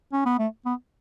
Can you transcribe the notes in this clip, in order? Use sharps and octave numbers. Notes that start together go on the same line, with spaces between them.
C#4
B3
A3
B3